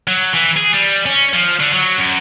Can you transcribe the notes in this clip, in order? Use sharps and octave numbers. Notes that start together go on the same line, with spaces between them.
F#3
E3
G#4
G3
C#4
F3
D3
F#3
F#2